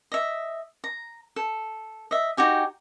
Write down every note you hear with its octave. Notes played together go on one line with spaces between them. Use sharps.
D#5 E5
A#5
A4
D#5 E5
D#4 F#4 G4 G#5